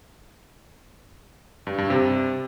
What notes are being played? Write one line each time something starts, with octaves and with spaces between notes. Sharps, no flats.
G2
G2
C3